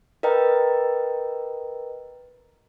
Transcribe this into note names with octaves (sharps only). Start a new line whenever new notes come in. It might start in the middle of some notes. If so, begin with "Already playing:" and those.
A#4 B4 D#5 G5 A#5